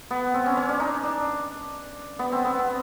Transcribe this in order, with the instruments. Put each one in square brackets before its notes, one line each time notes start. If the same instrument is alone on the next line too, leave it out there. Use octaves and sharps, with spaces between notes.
[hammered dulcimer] B3
C4
C#4
C#4
D4
D#4
D4
B3
C4
B3
C4